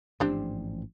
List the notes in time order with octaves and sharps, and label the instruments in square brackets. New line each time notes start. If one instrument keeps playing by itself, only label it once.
[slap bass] A1 G#2 F3 [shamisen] C4 D4 G4